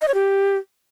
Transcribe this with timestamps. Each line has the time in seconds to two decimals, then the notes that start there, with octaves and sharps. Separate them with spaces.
0.02 D#5
0.08 C#5
0.14 G4